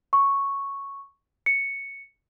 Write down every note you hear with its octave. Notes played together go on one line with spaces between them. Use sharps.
C#6
C#7